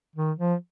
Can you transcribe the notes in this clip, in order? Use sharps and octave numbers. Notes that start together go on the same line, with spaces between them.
D#3
F3